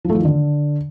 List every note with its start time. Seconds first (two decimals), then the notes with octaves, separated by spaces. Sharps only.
0.05 F3
0.10 A3
0.15 F3
0.20 D#3
0.25 D3